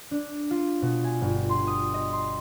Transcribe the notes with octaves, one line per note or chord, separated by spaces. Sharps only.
D4
F4
B2
G#5
G1
C6
D#6
D#5
C6